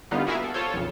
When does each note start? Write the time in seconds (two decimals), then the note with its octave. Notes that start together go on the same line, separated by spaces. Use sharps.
0.11 D3 G3 A#3 B3 D#4 F4
0.27 E4 F#4 G#4 A#4 E5 F5
0.39 B3 A4
0.54 F4 A4 C5 C#5
0.74 B1 F2 C#3